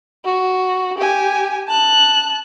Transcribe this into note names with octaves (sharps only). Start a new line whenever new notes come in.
F#4
G4 G#5
A5 F#6